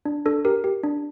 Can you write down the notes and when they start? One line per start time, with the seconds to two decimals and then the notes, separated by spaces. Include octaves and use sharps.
0.05 D4
0.25 D4 A4
0.45 G4 A#4
0.64 G4
0.83 D4